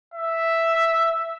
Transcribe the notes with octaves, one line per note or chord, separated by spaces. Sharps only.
E5